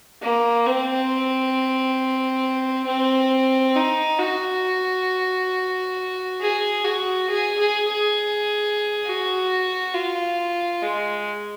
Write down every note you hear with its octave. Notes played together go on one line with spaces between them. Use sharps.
A#3
C4
C4
D#4
F#4
G#4
F#4
G#4
G#4
G#4
F#4
F4
G#3